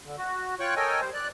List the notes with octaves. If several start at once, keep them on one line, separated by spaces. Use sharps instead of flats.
D3
F#4
F4 C#5 G5 C#6 F#6
A4 A#4 C#5 D#5 G5 G#5
G3 C5
D5 F#6